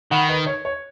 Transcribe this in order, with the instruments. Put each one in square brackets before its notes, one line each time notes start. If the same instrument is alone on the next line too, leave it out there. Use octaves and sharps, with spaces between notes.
[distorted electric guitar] D#3 [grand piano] F#5 B5
[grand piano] B4 D#5
C#5
C#5